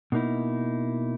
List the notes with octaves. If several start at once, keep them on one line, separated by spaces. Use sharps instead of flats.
B2 A#3 D#4 E4